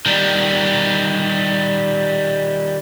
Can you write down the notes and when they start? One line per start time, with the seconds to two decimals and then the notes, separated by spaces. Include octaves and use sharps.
0.06 D#3 G3